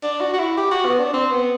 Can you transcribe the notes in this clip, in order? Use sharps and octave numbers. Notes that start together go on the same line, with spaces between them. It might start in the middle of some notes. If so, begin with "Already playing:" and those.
D4
F#4
F#4
E4
G4
F#4
B3
D4
C4
B3